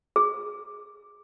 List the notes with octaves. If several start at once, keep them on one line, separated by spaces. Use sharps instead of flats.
G#4